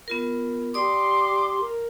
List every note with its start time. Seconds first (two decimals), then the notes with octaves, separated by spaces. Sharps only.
0.08 B3 F4 A#4
0.74 G4 D5 C6 D6 D#6
1.60 A#4